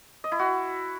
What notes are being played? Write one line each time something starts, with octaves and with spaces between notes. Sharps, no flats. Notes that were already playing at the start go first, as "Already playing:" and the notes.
D#5
E4
F#4